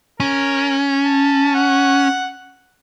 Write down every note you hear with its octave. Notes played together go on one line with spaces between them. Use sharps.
C#4 A#4
A5
F#5